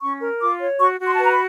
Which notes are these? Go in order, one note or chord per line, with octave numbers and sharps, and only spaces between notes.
C#4 C#6
A#4
F4 D6
C#5
F#4 C#6
F#4
C6
A5
B4 A#5
B5